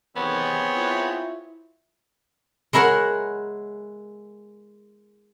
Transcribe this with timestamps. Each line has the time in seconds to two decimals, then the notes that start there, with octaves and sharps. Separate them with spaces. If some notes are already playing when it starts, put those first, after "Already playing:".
0.16 C3 D#3 E3 B3 C4 G#4 C#5
0.75 E4 F4
2.73 G#3 E4 A#4 C#5 F#5